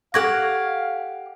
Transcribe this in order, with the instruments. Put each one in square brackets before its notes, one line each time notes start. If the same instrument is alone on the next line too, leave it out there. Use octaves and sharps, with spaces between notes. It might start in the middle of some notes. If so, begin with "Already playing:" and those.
[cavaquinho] G4 F#5 C#6 [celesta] A4 G#6 A#6 [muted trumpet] F5